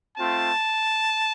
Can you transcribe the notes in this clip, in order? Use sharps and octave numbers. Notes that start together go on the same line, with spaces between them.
A3 C4 F4 A5